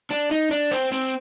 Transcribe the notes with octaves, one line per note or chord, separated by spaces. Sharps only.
D4
D#4
D4
C4
C4